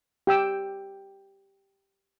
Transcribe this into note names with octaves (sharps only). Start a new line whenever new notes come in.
G4 G5 E6